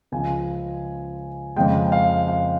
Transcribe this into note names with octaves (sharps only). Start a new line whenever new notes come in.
C#2 C#3 F3 G#3 G#5
F2 C#3 G#3 G5
F5
F5